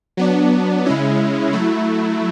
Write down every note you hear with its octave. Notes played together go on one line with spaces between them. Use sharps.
F#3 B3 D4
C#3 G#3 C#4 E4
F#3 A3 E4